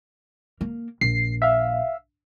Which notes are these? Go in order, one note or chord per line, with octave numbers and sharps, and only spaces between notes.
A#3
A#1 C7
E5 F5